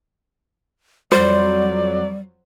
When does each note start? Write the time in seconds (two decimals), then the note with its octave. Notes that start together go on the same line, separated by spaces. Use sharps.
1.12 F2 F#3 G3 C5 D5